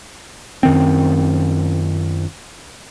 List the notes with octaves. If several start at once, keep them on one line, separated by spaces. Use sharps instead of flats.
F#2 D#3 C4